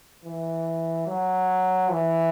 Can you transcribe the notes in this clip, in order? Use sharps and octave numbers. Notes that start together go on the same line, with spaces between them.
E3
F#3
E3